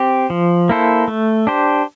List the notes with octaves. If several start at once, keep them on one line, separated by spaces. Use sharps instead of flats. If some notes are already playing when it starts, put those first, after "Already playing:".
Already playing: C4 G4
F3
A#3 E4 A4 C5
A3
D4 G4 C5